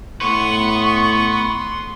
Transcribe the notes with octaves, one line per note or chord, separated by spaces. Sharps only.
A2 B3 B4 C6 C#6